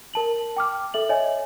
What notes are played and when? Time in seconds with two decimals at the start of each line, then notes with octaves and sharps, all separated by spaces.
0.14 A#4 A5 F#7
0.57 G5 D6 F6
0.94 A4 E5 F#7
1.09 C#5 D#5 E5 G#5